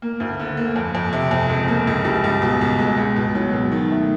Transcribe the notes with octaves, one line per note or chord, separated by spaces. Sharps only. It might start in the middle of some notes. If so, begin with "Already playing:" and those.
A#3
D2
D3
A#3
F2
F2
C3
F2
C#2
A#3
C#2
G3
C#2
B2
C#2
G#3
C#2
B2
F#3
B2
D#3
A3